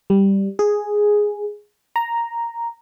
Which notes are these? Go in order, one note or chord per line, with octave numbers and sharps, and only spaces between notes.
G3
G#4
A#5